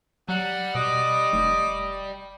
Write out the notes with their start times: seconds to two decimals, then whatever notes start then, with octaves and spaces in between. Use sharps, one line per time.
0.29 F#3 G3 F#5
0.75 B2 D#5 D6
1.33 F1